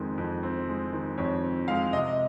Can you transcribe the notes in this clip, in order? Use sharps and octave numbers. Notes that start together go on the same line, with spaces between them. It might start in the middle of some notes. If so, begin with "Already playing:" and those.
Already playing: F2 D#3 G#3 C4
F2
C4
G#3
D#3
F2 C#5
C4
G#3 F5
C3 D#5